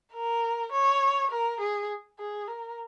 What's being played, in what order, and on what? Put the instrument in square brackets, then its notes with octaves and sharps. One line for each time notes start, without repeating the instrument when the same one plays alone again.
[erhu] A#4
C#5
A#4
G#4
G#4
A#4